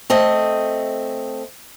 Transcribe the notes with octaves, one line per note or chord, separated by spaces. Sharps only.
A3 C4 D#5